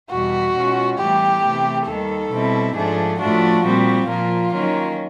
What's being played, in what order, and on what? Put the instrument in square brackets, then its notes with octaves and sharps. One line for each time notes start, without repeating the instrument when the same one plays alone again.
[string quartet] E2 B2 G3 [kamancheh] F#4
[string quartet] B2 G#3 C#4 F4
[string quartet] A2 E3 G3 B3 [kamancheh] G4
[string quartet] C3 E3 A3
[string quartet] D#2 D#3 G3 [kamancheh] A4
[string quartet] B2 G3 C4 E4
[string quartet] G#2 F3 A3 D4 [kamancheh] G#4
[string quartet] A2 F3 A3 D4 F4 [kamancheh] F#4
[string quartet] A#2 G3 C4 [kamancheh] F#4
[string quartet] A#2 F3 A#3 [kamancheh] F4
[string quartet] D#3 F#3 A#3 C#4